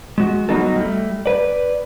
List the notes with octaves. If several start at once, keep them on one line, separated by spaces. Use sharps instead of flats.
G#3 F#4
F#3 G3 B3 D#4 F#4 A4
G3 A3
B4 D5